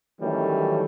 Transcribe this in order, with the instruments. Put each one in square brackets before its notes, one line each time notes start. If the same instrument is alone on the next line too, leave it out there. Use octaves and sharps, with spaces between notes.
[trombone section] D#3 E3 F#3 G3 A3 C#4